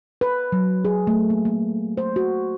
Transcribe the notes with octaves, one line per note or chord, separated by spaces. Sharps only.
B4
F#3
G#4
A3
A#3
A#3
C5
F#4